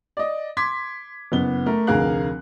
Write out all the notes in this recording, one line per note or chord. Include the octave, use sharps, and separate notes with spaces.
D5 D#5
C6 D6 G#6 B6
F#1 B3 G7
A3 A#4
F1 D2 G#4 A#4 F5 F#6